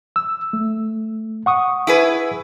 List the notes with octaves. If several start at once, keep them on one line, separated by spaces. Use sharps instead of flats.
E6
A3
F#5 C#6 D#6
E4 G#4 B4